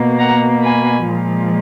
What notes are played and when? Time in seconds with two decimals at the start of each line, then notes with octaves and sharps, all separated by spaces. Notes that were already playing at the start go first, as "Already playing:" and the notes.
Already playing: B2 A#3
0.18 F#5 A#5
0.62 G#5 B5
1.06 A#2 F3 G#3